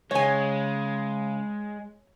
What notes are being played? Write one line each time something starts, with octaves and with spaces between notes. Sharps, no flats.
C#3 G#3 C#5 G#5